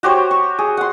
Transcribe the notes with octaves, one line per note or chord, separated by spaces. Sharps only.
F#4 G4 C5 C#5
C#6
G#4
F#5 C6